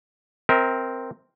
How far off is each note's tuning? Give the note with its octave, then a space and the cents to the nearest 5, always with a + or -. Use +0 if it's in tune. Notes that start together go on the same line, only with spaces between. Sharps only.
C4 +0 A#4 +0 E5 -45